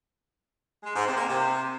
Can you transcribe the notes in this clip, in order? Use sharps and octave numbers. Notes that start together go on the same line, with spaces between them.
G#3
G#2
C3
A#3
C3